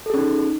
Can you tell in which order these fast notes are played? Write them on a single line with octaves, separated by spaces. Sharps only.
A4 G#4 C#4 D#4